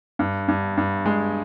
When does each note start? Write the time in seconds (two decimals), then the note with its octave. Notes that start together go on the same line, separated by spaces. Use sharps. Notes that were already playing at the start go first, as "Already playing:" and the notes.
0.19 G2
0.48 G2
0.77 G2
1.06 G#3